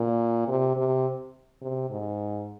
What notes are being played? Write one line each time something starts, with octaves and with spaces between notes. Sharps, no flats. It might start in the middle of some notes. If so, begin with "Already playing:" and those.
Already playing: A#2
C3
C3
C3
G#2